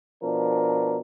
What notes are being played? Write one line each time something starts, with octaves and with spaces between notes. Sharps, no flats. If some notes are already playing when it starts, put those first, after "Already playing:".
B2 F3 D4 A#4